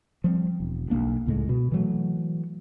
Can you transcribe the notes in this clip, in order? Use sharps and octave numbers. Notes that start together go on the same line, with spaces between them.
F3 G3 C4
E1
B1 A2 A#3 D4
C#2 A2 G#3
B2
E3 F#3 A3